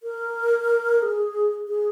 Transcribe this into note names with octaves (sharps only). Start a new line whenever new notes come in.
A#4
G#4
G#4